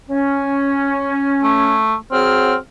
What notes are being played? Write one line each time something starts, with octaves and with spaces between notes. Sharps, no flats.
C#4
A3
F#3 C4 G#4 F6